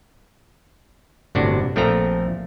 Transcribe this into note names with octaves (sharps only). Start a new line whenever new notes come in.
G1 A2 C3 D4 F#4
A#1 F3 A3 C4 A4 A#5